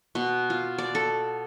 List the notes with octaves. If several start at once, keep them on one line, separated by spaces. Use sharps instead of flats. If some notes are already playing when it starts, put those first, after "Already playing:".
B2
F4
D5
A4